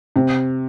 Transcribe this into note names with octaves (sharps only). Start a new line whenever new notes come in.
C3 C4